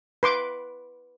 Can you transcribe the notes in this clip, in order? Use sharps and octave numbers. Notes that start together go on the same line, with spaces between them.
B4 C6 D6